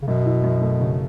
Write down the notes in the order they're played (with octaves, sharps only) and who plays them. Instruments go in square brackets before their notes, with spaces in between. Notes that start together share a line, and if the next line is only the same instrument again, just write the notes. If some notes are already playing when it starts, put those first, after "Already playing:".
[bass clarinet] C#3
[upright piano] F#2 [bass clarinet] B2
[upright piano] E4
F#2
A3
C#3